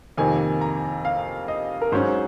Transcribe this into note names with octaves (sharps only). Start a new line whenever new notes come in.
F2 C3 D#3 A#3 G#5
A#5
F5
D#5
A#4
G#2 F#3 C#4 C5